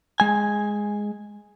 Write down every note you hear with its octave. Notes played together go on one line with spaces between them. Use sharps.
G#3 G#5